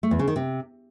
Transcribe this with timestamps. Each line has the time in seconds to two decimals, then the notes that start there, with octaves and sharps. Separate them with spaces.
0.03 A3
0.11 E2
0.19 C#3
0.28 D#3
0.36 C3